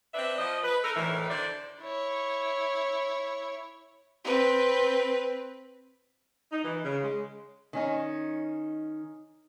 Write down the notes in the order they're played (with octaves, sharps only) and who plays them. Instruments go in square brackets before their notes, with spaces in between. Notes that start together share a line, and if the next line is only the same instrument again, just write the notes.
[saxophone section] C4 D4 B4 E5
F3 D#5
B4
D#4 A4 A#4
D2 A2 D#3 E3 E5
D3 D4 C5 D5
[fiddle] E4 C#5
C4 B4
[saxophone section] D#4
E3
C#3
G#3
[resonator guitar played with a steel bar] D#3 C#4 D#4